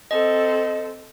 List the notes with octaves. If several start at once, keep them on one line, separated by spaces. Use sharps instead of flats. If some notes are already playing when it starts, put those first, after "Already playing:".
C4 A4 D#5